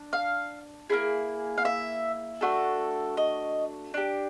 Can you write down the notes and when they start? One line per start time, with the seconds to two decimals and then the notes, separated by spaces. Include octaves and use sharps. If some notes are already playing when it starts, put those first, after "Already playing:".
Already playing: D4
0.13 F5
0.90 A#3 C#4 E4 G#4
1.58 F5
1.65 E5
2.41 A3 D4 F#4 A4
3.17 D#5
3.94 D4 G4